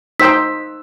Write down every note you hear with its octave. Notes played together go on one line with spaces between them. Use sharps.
D#4 C5 G5 E6 B6